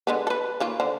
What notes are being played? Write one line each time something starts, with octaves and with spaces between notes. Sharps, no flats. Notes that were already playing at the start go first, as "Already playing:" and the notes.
D3 G#3 B3
A4 B4
D#3 A#3 F4
D3 C5